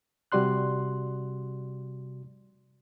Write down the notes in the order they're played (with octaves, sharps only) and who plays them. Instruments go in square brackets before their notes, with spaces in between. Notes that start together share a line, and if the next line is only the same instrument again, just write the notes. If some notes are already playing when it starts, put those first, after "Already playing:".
[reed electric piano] C3 G3 F#4 D5 C6 F#6